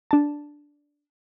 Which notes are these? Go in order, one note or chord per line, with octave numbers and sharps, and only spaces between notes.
D4 A5